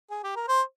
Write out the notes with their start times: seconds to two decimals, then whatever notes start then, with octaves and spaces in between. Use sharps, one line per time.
0.11 G#4
0.24 G4
0.36 A#4
0.48 C5